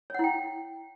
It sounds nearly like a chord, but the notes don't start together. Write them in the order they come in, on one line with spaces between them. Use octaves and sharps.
C#5 F#5 E4 G5